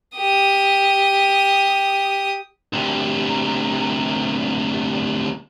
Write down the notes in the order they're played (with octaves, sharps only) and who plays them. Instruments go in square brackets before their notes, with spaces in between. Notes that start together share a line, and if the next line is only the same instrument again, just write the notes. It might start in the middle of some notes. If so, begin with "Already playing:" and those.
[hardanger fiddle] G4 D#6
[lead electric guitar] D2 C3